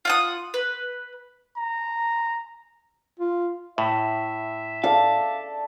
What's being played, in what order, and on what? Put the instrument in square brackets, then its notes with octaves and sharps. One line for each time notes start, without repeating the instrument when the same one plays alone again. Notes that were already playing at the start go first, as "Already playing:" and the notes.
[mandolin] F4 F#5 D#6
B4
[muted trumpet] A#5
[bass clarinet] F4
[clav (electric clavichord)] A2 [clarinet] E5
[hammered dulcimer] A4 D5 [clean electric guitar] F5